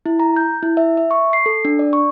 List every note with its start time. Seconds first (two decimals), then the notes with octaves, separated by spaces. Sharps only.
0.06 E4
0.20 A#5
0.36 G6
0.63 E4
0.77 E5
0.97 E5
1.11 C#6
1.33 C7
1.46 A4
1.65 D4
1.79 D5
1.93 C#6